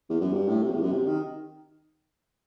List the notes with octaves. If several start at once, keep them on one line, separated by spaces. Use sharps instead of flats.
E2
F#2
G2
A2
C3
E2
F#2
C3
D#3